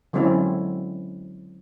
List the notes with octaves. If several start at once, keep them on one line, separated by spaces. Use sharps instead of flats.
D3 F#3 G#3 C4 C#4 E4